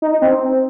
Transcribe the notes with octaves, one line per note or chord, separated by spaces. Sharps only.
D#4
D#4
C4